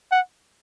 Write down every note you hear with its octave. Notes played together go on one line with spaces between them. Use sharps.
F#5